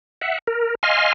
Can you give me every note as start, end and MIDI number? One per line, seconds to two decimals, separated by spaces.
0.21 0.38 76
0.21 0.38 78
0.47 0.75 70
0.83 1.13 75
0.83 1.13 77
0.83 1.13 80
0.83 1.13 84
0.83 1.13 89